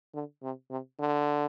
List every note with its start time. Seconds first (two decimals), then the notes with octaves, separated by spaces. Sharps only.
0.14 D3
0.43 C3
0.70 C3
0.99 D3